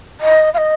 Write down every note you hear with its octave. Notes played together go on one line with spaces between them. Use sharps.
D#5
F5
D#5